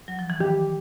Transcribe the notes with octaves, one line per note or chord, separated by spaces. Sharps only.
F#3
F3
E3
D#3 G4